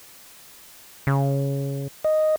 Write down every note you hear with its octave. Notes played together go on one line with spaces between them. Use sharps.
C#3
D#5